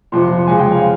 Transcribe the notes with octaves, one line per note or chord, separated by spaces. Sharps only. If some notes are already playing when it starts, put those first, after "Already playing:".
F2 C3 F3 C6
C6
F2 C#3 G#3 G#5
G5
F5